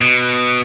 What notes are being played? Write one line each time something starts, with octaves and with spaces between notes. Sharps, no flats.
B2